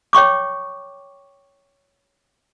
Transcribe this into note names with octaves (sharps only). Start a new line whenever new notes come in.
C#5 G5 C#6 D6